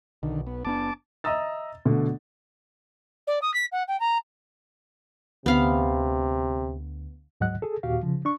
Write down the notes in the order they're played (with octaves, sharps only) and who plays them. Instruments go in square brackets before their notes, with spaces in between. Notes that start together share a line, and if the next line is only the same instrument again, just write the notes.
[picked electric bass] B1 [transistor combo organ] D3 D#3
[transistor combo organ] B3
[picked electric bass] F#1 B3 D4 [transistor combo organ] A5 D6
[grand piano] D#5 E5 A#5 D#6 E6 A6
B2 D3 A3
[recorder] D5
D#6
B6
F#5
G5
A#5
[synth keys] D2 [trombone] C3 [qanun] B3 F5 B5
[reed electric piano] D2 G#2 F#3 D#5 F#5 F#6
G#4 A4
D#2 A#2 F#4 G4 F5
C#3 F3
D4 C#6